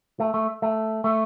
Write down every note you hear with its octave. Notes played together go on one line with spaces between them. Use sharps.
A3
A3
A3
A3